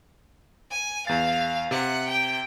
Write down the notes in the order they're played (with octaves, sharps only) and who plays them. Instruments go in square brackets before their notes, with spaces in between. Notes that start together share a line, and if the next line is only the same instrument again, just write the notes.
[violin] G#5
[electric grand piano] E2 A6 [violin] F5
[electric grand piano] C3 [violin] F#5
[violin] G5